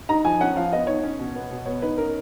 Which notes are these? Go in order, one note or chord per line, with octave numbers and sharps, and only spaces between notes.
D#4 A#5
F3 G#5
C#4 F#5
F3 F5
B3 D#5
D#4 C#5
C#4
B2
B3
B2
B3 C#5
D#4 B4
C#4 A#4